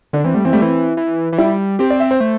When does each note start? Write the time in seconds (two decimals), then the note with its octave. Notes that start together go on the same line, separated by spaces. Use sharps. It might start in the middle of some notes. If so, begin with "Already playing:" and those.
0.13 D3 D4
0.24 E3 C4
0.34 G3 A3
0.45 E3 C4
0.53 G3 A3
0.60 E3 C4
0.97 E3
1.33 E3
1.38 G3 E4
1.79 C4 G4
1.90 D5
2.00 E5
2.11 C5
2.20 A3